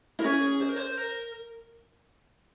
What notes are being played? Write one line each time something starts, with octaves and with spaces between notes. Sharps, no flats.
E4 A#4
C#4 G#4
C5
A#4
C5
A#4